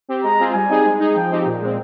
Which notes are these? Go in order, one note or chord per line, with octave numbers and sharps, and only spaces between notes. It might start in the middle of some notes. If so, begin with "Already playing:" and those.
C4 G4
G#3 A#5
C4 F4 G#4
G3 G#5
C4 D#4 G#4
G#3
D#4 G#4
F3 G5
C4 D#4 G4
A#2
G#3 C4